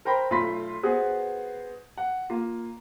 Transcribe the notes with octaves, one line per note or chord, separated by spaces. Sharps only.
A#4 C5 G5 A#5 B5
B1 A3 F4 B5 C6 B6
B3 F#4 G#4 B4 C5
F#5
A#3 F4